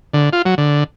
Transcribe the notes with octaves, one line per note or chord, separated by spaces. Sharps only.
D3
F4
F#3
D3